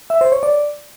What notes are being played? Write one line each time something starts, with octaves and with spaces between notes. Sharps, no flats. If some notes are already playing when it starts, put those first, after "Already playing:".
E5
C5
C#5
D5